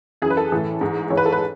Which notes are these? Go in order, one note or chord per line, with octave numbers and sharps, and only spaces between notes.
F#2 E3 G#4
B4
A4
A2 E3
G#2 E3
G#2 E3 C#5
B4
A4
B4